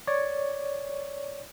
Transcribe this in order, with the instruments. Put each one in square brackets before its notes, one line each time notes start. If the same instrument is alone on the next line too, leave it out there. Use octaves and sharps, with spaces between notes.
[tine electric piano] C#5 D5